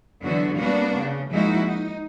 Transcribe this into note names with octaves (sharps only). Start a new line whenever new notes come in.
D3 E3 F#3 B3 F#4
G3 A#3 B3 D4 F#4
C#3
F3 G#3 A#3 D#4 E4 F#4
D#4